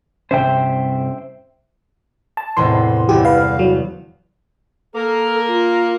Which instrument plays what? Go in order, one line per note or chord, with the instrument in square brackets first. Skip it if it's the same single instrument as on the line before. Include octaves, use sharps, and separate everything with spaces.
[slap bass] G2 C3 C#4 [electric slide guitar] C5 E5 G5
[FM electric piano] A5
[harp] E2 A2 C3 [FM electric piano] C6
[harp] G1 E2 [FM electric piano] G4
[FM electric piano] B4 F5
F#3
[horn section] A#3 A#4 [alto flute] A4
[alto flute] F4